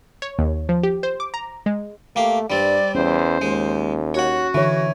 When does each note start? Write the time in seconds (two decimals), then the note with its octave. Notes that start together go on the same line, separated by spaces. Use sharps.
0.22 C#5
0.39 D#2
0.69 F3
0.83 G4
1.03 C5
1.20 D6
1.34 A#5
1.66 G#3
2.16 A3 A#3 G4 F5
2.50 G2 G3 C4 D5
2.95 E2 C#4 C5
3.41 D#2 G#3
4.14 F#4 C#5 F#5
4.54 D3 E3 C#5